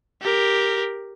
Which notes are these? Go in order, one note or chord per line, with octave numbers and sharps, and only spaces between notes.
G4 A#4